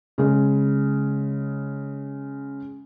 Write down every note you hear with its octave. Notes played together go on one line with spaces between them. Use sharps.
C#3 G#3